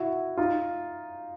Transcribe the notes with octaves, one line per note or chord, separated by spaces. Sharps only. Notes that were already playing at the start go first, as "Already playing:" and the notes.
Already playing: E4 F#4
D#4 F4